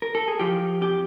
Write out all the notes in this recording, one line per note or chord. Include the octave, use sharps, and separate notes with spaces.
A#4
A4
G#4
F3 G4
F2 G4